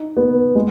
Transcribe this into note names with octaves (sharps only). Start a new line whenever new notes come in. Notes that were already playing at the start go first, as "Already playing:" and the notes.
Already playing: D#4
B3
G#3